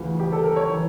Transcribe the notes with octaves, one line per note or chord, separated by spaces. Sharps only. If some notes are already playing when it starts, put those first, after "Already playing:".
Already playing: D2 C#3 E3 F4
G4
A4
A#4
C#5
E3